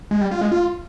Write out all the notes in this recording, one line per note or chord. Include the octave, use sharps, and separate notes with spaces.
G#3
G3
F4
G#3
F4